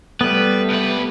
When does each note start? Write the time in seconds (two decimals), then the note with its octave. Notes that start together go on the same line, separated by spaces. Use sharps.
0.21 G3 A3 B3 B4
0.70 C2 B4